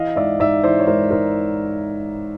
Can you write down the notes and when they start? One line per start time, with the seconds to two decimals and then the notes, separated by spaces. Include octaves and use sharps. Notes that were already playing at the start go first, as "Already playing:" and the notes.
Already playing: E3 D#5 F5
0.16 G#2 D5 E5
0.40 G#2 D5 E5
0.64 E3 C5 D5
0.80 C#5
0.87 G#2 A#4 C5
1.11 G#2 A#4 C5